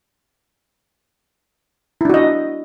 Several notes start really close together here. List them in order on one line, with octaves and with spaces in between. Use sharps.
E4 D4 F#4 D#5